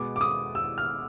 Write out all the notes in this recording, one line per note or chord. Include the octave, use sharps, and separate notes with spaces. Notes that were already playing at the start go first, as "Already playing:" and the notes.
Already playing: B2 G#3 B3 D6
D6
D#6
E6
F6